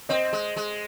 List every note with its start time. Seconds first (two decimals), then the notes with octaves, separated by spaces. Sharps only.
0.09 C4 C5 D#5
0.33 G#3
0.56 G#3